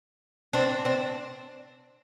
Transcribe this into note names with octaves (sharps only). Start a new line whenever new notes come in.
C4 D4
C4 D4